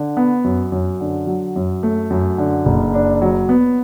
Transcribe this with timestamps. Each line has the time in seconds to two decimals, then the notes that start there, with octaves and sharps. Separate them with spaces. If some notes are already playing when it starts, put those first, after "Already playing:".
Already playing: D3
0.17 B3
0.44 F#2
0.72 F#2
1.00 D3
1.27 F#3
1.56 F#2
1.83 A3
2.10 F#2
2.38 D3
2.65 F#1
2.94 D4
3.22 F#3
3.49 B3